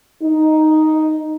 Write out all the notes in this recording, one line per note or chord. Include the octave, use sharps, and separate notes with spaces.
D#4